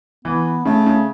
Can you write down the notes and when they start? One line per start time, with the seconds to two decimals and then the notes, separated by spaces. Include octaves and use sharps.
0.25 E3 B3
0.65 C#3 A3
0.86 C#3